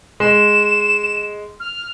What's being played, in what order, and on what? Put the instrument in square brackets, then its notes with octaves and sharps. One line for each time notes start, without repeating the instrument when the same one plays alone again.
[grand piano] G#3 [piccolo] E7
[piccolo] F6